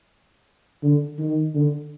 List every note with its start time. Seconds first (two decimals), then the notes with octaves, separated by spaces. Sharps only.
0.83 D3
1.19 D#3
1.55 D3